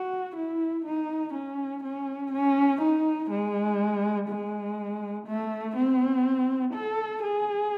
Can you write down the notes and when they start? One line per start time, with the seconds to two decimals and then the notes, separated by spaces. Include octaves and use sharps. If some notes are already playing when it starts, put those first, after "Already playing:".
Already playing: F#4
0.36 E4
0.85 D#4
1.34 C#4
1.84 C#4
2.32 C#4
2.82 D#4
3.31 G#3
4.29 G#3
5.27 A3
5.76 C4
6.74 A4
7.24 G#4